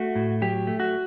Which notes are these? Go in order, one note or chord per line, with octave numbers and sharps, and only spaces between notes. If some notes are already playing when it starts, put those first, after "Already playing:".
Already playing: A3 F#4
A2
F#3 G4
A3
F#4